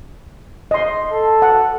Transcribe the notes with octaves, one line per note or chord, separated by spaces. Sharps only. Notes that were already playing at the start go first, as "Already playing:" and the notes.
D#5 C6
A4
F#5